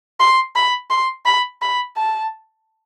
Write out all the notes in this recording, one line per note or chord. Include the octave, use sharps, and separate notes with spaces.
C6
B5
C6
B5
B5
A5